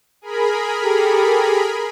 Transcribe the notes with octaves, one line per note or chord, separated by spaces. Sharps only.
G#4 A#4 B5
G4 A4